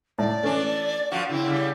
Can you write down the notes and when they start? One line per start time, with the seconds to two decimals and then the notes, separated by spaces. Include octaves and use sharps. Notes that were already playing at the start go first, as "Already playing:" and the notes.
0.19 A2 D5
0.43 E3 A3 C#4 D4
1.12 F#2 F3 F#4 F5
1.29 C#3 C4 E4
1.46 C#3 G3